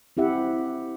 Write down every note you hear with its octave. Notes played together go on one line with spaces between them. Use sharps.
C4 E4 G4 E5 F#5